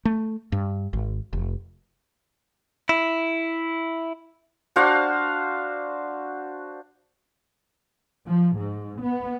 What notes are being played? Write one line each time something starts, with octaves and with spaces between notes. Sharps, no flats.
A3
G2
G#1
F1
E4
D4 F#4 C5 F5
F3
G#2
B3